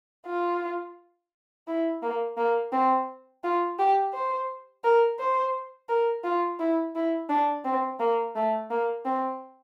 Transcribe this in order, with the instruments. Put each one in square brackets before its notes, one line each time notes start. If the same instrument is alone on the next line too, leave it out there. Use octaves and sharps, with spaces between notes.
[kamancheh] F4
E4
A#3
A#3
C4
F4
G4
C5
A#4
C5
A#4
F4
E4
E4
D4
C4
A#3
A3
A#3
C4